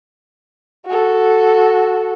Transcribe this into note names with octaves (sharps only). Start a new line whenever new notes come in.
F#4 A4